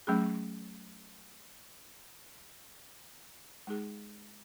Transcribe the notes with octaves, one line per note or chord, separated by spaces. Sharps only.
F#3 A3 C#4 G#4
G#3 D#4 G#4